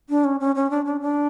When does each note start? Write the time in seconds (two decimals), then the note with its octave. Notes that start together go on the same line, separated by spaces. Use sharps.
0.10 D4
0.25 C#4
0.40 C#4
0.55 C#4
0.70 D4
0.85 D4
1.01 D4